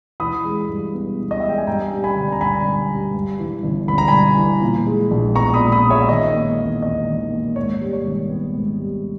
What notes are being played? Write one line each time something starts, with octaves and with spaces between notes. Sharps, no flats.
E3 B5 D#6
G#3
G2
B3
E3
D#5
G#3 E5
G5
G#5
G2 G5 A#5
G3
G#5 B5
G1
A#5
G1 G#5 B5
G2
G3
G2
E3
G1
G1 B5
A#5
G2 G#5 B5
E3
A#2
G#3
A#1
B3 A#5 C#6
B5 D#6
A#2
B5 D#6
G#3
C#5 E5
E5
D#3 D#5
A#3
E2
E2 D#5
D#3
A#3
G#2 C#5
G3
C#5
G#1
B3
G#2
G3